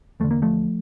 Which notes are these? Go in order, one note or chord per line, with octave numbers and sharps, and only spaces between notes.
E2 D3 A3
A#3
F3 A3